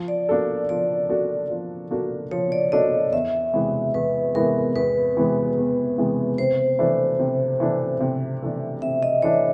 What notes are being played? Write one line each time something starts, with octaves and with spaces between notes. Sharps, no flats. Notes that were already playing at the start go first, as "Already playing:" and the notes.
Already playing: F3
D5
A#3 D4 F#4 A4
F3 D5
A#3 D4 F#4 A4
F3
A#3 D4 F#4 A4
F3 C#5
D5
A#3 D4 F#4 A4 D#5
E2 E5
C3 E3 G#3 B3
E2 B4
C3 E3 G#3 B3 A#4
E2 B4
C3 E3 G#3 B3
E2
C3 E3 G#3 B3
C3 C5
E3 A3 D4
C3
E3 A3 D4
C3
E3 A3 D4
C3 E5
D#5
E3 A3 D4 C#5